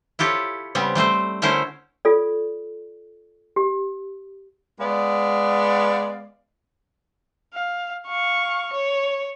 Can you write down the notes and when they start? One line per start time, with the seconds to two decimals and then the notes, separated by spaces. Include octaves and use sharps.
0.19 E4 F4 G4 A4 C#5
0.75 C#3 G3 B3 C4
0.95 G3 A3 C4 C5
1.42 D3 A3 C#4 E4 A#4 C5
2.05 F4 A4 D5
3.56 G4
4.80 G#3 B3 D5 F5
7.53 F5
8.08 F5 C#6
8.73 C#5